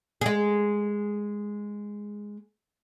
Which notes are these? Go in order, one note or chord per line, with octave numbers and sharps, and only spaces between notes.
G#3 G#4